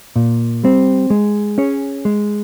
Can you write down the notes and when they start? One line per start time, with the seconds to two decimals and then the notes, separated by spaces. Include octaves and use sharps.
0.16 A#2
0.64 G3 C4
1.10 G#3
1.58 C#4 G#4 C#5
2.05 G#3